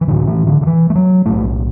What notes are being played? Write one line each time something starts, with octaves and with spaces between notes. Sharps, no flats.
E3
A1 A2 D3
E3
D3
D3
E3
A3
F#3
B1 A2 A3